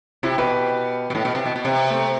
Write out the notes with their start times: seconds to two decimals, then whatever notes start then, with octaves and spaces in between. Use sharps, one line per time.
0.23 C3 E4 G4
0.38 B2 G4 B4
1.10 B2
1.15 A2
1.25 B2
1.35 C3
1.46 B2
1.56 B2
1.65 C3
1.90 A3 C4